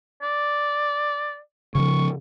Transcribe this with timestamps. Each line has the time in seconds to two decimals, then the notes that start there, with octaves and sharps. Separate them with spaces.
0.22 D5
1.75 C#3 E3 F3 C#6